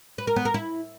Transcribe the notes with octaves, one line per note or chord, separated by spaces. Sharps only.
B4
A#4
B3
A#4
E4